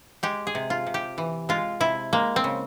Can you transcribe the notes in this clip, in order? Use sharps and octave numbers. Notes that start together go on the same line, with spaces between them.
G#3 G4
G#4
C3
F4
C3
G4
E3
G#3 F4
C3 E4
G#3 A#3
C4
C#3